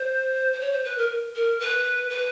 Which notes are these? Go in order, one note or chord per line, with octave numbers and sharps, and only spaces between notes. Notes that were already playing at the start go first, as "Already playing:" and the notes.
Already playing: C5
C5
C#5
C5
B4
A#4
A#4
B4
B4